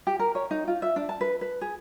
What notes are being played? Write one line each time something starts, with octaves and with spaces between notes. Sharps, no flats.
G4
A#4
C#5
D#4
F4
E5
D4
A5
B4
B4
G#4